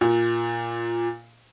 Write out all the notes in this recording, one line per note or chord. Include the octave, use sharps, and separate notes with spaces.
A#2